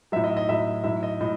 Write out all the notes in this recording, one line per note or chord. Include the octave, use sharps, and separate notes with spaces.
A2 F#3 E5
D#5
D#5
A2 F#3 E5
A2 F#3 E5
D#5
A2 D#5